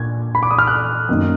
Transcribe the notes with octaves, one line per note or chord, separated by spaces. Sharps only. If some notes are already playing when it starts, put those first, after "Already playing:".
Already playing: A#2 D4 G#6
B5
D6
D#6
F6
F#6
F#2 D#3 A#3 D#4